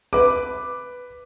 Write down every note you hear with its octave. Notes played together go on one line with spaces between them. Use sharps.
B4 D6